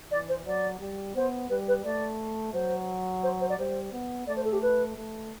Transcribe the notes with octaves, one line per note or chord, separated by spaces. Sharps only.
E3 D5
C5
F#3 D5
G3
B3 C5
G3 B4
B4
A3 D5
F#3 C5
C5
C5
D5
G3 C5
B3
A3 D5
C5
A4
G4
B4
A3